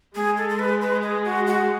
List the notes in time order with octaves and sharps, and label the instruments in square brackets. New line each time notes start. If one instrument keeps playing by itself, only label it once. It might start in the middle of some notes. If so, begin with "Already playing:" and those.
[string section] G#3 [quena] G#4
[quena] A4
A4
B4
B4
G#4
F#4
F#4